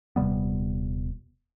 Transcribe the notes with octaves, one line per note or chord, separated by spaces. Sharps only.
D#1 C3 G3 B3